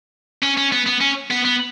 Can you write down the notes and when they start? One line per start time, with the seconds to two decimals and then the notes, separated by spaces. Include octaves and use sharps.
0.42 C#4
0.57 C#4
0.72 B3
0.86 B3
1.00 C#4
1.30 B3
1.45 B3